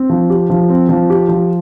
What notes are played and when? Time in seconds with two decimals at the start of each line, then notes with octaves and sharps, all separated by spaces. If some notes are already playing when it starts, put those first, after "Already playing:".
Already playing: C4
0.10 F3
0.30 G4
0.50 F3
0.70 C4
0.89 F3
1.10 G4
1.29 F3